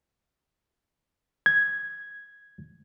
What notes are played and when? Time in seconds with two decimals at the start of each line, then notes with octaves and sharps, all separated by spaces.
1.46 G#6